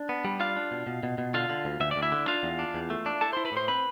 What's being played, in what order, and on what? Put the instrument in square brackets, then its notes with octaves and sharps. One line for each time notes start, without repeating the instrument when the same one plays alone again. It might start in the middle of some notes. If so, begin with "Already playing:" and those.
Already playing: [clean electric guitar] D4
B3
G3
D4 F4 F5
D4
B2
B2
B2
B2
D3 F4 F5
D3
D2
D2 E5
D5
D2
E4 E5
D3
D4 F4 F5
E2
D4
E2
A3
D4
E4 A4 A5
E4 C5 C6
B4 B5
A2 C5 C6
C4 B4 B5